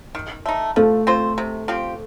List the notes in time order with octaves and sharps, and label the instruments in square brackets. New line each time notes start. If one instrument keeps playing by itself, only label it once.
[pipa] D#3
A3 D#4
[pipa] F3 [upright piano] A3
[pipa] C4 F4 C5
C3
F3 C4 G4